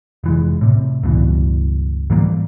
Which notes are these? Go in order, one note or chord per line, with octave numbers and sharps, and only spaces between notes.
F1 E3 G#3
A2 C3
C#2 G2 B2 E3
G#2 E3 G3 A#3